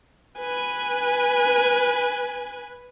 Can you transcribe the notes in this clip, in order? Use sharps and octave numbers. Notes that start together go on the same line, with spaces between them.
B4 G#5